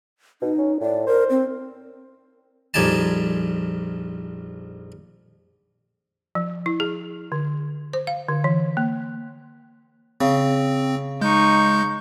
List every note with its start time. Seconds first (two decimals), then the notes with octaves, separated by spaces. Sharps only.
0.42 B2 D#4
0.58 C#4
0.81 A2 D5
1.07 A#4 C5
1.30 C4
2.74 A#1 F2 G3 D#4 G#5 A5
6.35 F3
6.66 E4
6.80 G#4
7.32 D3
7.93 C5
8.07 F5
8.28 D3
8.44 E3
8.77 A#3
10.21 C#3 C4
11.21 G#3 D#4 C#6 G6